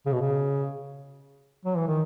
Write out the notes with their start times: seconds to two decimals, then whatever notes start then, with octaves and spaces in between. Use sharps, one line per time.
0.06 C#3
0.13 B2
0.21 C#3
1.65 F#3
1.76 E3
1.88 D#3